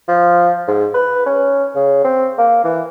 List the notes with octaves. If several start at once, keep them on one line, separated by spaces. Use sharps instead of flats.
F3
G#2
B4
C#4
C#3
C4
A#3
E3